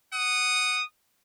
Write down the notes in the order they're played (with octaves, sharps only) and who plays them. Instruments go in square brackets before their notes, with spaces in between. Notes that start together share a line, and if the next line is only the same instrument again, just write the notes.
[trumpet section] F#5 D#6